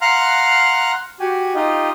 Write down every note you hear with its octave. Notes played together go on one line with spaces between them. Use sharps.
F5 F#5 A#5 C6 F6 F#6
F#4 G4 G#5
D#4 F4 G4 D#5